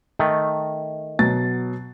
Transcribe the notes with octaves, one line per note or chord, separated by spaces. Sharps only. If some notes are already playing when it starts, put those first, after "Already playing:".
D#3 A3
B2 F#3 A6